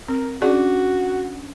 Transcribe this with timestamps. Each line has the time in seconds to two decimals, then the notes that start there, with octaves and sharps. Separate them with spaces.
0.08 C4 A#4
0.42 C#4 D4 F#4 G#4 D5